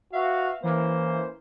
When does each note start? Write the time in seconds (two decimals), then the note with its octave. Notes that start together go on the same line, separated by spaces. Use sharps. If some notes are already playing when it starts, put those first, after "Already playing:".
0.13 F#4 B4 E5 F5
0.63 E3 A#3 C#4 B4 C5